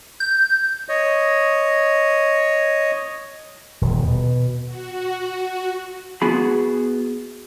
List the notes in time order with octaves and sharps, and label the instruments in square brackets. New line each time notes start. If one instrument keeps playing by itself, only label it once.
[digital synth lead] G6
[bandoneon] C#5 D#5
[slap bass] D#1
B2
[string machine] F#4
[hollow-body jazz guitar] B3 F#4 G#4 B5